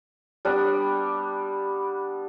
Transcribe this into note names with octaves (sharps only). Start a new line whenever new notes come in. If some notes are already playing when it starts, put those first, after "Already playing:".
G3 B3 D4